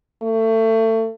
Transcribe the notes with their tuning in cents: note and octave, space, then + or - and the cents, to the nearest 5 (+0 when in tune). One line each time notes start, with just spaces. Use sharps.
A3 +30